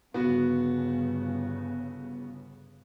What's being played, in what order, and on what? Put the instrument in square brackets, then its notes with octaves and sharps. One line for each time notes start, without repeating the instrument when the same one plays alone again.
[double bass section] G1 C#3 [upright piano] B3 F#4